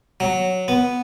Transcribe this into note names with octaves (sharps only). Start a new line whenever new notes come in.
F#3
B3